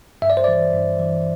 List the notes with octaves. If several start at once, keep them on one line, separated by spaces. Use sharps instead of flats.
G2 E5
D5
C5
E3 D5
G2
E3